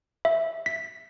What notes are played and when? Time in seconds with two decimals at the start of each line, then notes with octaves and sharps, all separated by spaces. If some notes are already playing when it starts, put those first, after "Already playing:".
0.25 E5
0.66 B6